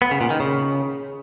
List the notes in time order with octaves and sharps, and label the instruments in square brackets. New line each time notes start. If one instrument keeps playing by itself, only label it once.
[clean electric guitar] B3
C#3
A#2
D#3
C#3